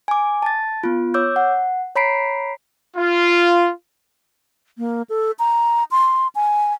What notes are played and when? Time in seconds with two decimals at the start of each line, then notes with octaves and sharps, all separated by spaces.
0.08 G#5 D6
0.42 A5 A6
0.84 B3 F4
1.14 C#5 D6 E6 G6
1.36 F#5
1.96 C#5 A#5 B5 B6 C7 D7
2.97 F4
4.78 A#3
5.10 A4
5.39 A#5
5.91 C6
6.35 G#5